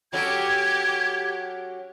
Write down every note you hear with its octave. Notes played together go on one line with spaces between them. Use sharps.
F#3 C#4 G4 A4 G#6